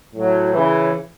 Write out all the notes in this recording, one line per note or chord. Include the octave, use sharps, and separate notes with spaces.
A2 F#3
C#3 E3